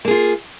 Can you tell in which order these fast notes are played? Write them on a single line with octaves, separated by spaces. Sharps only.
A#3 G#4 F4